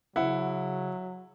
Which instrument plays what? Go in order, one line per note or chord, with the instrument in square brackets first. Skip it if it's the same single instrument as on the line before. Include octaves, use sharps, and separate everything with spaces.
[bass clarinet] C#3 [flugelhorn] F#3 [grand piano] E4 [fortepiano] F#5